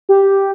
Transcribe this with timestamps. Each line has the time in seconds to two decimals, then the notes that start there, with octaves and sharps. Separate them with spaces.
0.09 G4